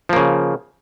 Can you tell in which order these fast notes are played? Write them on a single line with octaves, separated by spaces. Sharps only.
F3 A#3 C#3